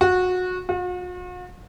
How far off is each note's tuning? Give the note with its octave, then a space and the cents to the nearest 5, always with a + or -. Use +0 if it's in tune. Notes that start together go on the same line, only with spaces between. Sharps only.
F#4 -20
F#4 -45